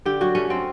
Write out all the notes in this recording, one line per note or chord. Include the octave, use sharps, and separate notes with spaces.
D3 G4
F#3 F#4
A3 C#4
A3 C4